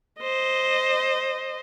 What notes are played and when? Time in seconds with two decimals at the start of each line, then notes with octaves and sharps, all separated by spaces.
0.22 C5 D#5